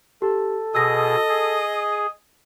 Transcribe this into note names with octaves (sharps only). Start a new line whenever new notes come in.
G4 A4
B2 G#4 D#5 E6 A#6
G#4